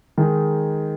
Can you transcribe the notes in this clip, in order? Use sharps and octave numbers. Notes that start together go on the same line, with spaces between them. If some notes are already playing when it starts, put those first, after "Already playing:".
D#3 G#3 D#4 G#4